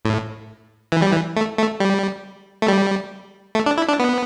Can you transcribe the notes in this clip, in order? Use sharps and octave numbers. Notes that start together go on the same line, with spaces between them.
A2
E3
G3
E3
A3
A3
G3
A3
G3
A3
D4
E4
D4
B3